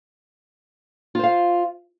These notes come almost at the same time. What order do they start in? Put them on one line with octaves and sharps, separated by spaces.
F4 C5 F5